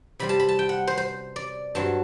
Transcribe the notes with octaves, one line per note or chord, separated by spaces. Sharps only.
C3 G3 C4 B5
A5
B5
A5
G5
F#5
C5
C5
D5
G2 F#3 C4 A5